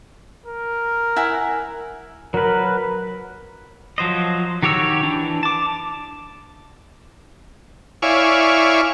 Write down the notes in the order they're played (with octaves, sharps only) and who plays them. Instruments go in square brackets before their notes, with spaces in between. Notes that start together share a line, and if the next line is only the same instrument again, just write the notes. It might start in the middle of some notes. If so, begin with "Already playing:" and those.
[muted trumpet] A#4
[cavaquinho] E4 F#5 G#5
[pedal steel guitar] F#3 B4 [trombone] A#4
[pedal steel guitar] F3 F#3 C5 D#5
D#3 F#4 G4 C#5 E6
E3 D4
A5 D6
[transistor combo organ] E4 C#5 D5 F5 G#5